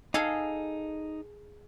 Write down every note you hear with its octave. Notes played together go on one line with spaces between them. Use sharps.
D#4 G#4 A4 F5